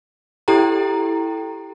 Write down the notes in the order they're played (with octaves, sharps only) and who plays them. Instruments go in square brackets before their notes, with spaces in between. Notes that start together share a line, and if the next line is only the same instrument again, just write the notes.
[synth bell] E4 G4 A4 G5 A#5